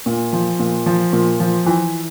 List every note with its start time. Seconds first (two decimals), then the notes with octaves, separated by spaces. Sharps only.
0.06 A#2
0.33 F3
0.59 A#2
0.86 F3
1.13 A#2
1.40 F3
1.66 E3